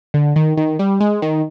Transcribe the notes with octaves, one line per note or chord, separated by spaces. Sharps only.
D3
D#3
D#3
G3
G#3
D#3